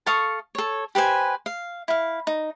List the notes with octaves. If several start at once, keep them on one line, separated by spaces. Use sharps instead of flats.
A4 F5 C#6 D#6
A4 C#5
G4 B4 C5 G#5
F5
E4 F5
D#4